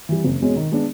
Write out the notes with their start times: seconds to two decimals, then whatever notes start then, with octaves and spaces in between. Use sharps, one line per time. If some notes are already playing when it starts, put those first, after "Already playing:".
0.09 E3 G3
0.24 F#1
0.41 E2 B2 G#3 C#4
0.56 D#3
0.72 G#3 B3 D4